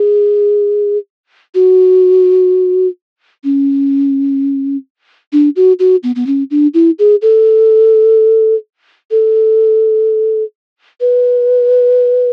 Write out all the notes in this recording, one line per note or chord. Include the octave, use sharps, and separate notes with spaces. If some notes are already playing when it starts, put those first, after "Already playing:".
Already playing: G#4
F#4
C#4
D4
F#4
F#4
B3
B3
C#4
D4
E4
G#4
A4
A4
B4